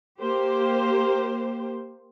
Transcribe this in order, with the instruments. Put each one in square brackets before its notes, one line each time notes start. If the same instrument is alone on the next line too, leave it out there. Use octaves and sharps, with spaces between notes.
[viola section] A#3 G4 C5